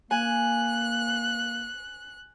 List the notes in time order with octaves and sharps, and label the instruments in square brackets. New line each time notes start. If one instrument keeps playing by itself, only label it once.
[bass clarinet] A#3 [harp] G#5 [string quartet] F#6